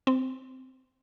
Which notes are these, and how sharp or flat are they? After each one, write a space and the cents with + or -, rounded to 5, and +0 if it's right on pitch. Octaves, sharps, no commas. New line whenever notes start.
C4 -15